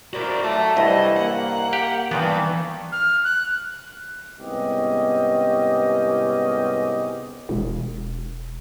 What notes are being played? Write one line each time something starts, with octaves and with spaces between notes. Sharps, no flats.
E4 F#4 A#4 C5 D5
F#3 A3 E5 A5
C2 G2 E3 E4 D#5
A#3 F#5
G4
G2 D#3 E3 B3
F6
F#6
C2 G#2 B3 C#4 G4 D#5
E1